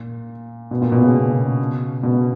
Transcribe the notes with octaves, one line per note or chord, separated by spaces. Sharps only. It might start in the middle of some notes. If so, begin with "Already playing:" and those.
Already playing: A#2
B2
A#2
B2
C#3
B2